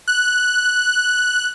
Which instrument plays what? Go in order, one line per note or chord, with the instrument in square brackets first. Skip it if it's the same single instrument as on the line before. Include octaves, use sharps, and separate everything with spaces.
[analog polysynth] F#6